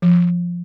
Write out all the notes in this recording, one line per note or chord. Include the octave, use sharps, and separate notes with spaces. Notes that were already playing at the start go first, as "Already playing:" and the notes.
F3